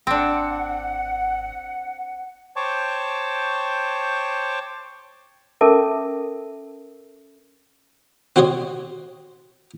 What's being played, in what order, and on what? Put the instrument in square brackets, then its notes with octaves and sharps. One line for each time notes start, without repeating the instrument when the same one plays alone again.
[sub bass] G#1 [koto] C4 D4 [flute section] F#5
[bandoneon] C5 C#5 G5 A5 C#6 D6
[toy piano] C#4 A4 A#4 E5 A5 D6
[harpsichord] C4 F#4 G4 C5 C#5 D#5